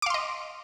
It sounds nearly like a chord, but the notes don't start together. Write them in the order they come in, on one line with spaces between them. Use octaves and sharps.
D6 F5 C6 D#5